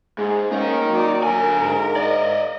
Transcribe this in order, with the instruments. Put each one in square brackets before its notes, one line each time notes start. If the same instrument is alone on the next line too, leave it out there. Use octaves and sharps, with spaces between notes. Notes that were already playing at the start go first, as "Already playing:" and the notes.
[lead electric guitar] G#2 [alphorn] G#4
[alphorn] A#3 [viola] C#4 [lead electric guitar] D#4 A#4
[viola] F#3 D5
[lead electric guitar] D3 G#5 [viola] A#4
[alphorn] G#2
[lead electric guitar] D5 D#5